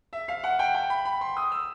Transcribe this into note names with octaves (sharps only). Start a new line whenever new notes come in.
E5
F5
F#5
G5
G5
B5
B5
C6
D#6
E6